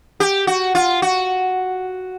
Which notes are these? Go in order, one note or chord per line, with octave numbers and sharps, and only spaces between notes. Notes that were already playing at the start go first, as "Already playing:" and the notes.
G4
F#4
F4
F#4